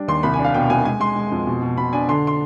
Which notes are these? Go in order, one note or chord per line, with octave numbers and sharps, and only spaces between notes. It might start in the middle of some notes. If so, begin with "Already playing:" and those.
Already playing: G3 D4
D#2 C6
C2 B5
G#5
D4
F5
B2 G5
C2 G#5
G#3 G#5
G#3 C6
G#3
F2
B2
B2
B2 B5
D4 G#5
D3 C6
C6